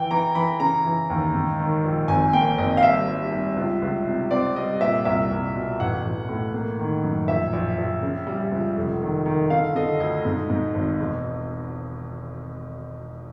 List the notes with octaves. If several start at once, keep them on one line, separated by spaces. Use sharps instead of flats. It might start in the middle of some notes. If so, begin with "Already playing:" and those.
Already playing: E3 G5
E3 A#5
E3 B5
C#3 A#5
E3
D#2
G#2
D#3
A#1
G#1 G#5
A#3 G5
G#1 D#5
F5
G3 E5
G3
G3
C#2
C#2
C3
C4 D5
G3 D#5
A#2 E5
C2 E5
C2
B2
A1 F#5
A1
A2
A#3
D#3
F#2
A#1 E5
A#1
A#1
C#3
G3
C#2
F1
D#3
D#3
D3 F5
D3 D#5
D2 D#5
G#2
G#2
G#1
E1